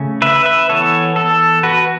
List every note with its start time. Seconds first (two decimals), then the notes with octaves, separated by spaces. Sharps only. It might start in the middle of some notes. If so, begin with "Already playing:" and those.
Already playing: C#3 A3 C#4
0.22 B4 E5
0.46 B4 E5
0.69 E3 B3 A4 C#5
1.16 A4
1.63 F#4 B4